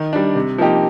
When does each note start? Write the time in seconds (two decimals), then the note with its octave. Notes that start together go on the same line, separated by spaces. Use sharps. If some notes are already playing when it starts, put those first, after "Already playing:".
Already playing: D#3
0.13 G3 D4
0.35 C3
0.58 F3 A#3 D#4 G4